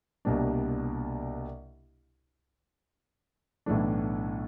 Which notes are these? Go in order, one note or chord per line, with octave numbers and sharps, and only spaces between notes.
C2 B2 G3 A#3 D4
B1 A2 E3 A3 D4